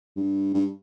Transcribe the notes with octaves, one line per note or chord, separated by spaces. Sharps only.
G2
G2